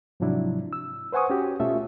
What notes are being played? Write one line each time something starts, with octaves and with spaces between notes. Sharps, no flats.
G#2 C3 F3 F#3 D4 E4
E6
B4 C5 F#5 G#5 C#6 D#6
C#4 F#4 G4
B2 A3 C#4 F4 A4 E5